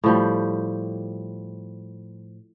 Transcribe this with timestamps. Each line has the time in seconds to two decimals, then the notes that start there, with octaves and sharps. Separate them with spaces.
0.04 A2 F3 G3